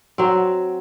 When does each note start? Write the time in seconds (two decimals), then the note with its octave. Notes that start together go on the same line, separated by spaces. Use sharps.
0.18 F#3 C4